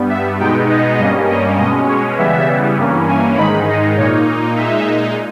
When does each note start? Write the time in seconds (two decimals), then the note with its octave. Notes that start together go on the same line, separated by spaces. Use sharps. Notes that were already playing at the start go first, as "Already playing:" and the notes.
Already playing: G2 G3 B3
0.10 E5
0.39 B2 G#3 B3 D#4 G5
0.69 D#5
0.99 G2 G3 A#3 C#4 D#5
1.28 D#5
1.58 B2 G#3 C#4 D#5
1.89 C#5
2.18 C#3 E3 G3 B3 E5
2.78 G2 E3 A#3 C#4
3.08 G#5
3.37 G#2 D#3 G#3 D#4 B5
3.67 D#5
3.97 A#2 A#3 D#4 C#5
4.56 A#2 G#3 D#4 E5